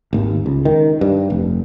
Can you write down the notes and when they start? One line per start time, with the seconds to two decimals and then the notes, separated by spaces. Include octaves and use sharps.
0.13 G#1 D#2
0.46 C#2
0.65 D#3
1.01 G2
1.30 F1